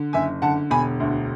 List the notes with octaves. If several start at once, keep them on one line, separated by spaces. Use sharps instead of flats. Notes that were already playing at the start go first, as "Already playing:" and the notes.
Already playing: D3
F#1 E5 G#5
D3 F#5 A5
E1 G#5 B5
D2